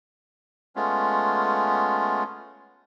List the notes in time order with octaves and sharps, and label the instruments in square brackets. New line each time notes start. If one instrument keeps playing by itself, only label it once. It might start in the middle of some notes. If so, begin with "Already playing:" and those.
[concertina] G#3 A3 B3 C#4 F4